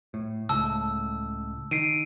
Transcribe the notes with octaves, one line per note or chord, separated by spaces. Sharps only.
A2
C#2 A2 A5 E6
D#3 C7 D7 D#7